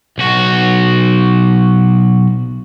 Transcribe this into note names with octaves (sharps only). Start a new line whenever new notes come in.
B1 F#4